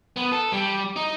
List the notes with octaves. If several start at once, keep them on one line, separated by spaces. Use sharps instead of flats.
B3
A4
G3
D#4